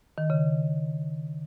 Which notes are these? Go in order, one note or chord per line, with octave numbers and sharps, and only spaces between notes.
D#3
C#3